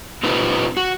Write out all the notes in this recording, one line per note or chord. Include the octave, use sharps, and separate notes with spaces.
C4 D#4 F4 G4 B4 C5
F#4